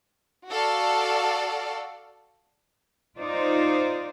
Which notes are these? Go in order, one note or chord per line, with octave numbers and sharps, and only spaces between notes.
F#4 A4 D5 F5
D#4 F4 C5 D5